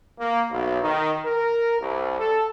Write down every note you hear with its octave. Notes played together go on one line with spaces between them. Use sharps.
A#3
B1
D#3
A#4
C2
A4